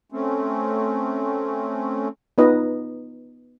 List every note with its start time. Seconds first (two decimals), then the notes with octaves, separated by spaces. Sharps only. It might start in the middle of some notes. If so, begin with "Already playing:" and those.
0.12 A3 C4 C#4
2.38 B3 D#4 F4 B4 D#5